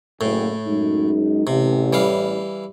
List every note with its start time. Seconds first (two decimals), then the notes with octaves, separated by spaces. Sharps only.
0.21 F#1 A2
0.66 F#2 G#3 D#4
1.47 A1 C3
1.93 E3 G3 F5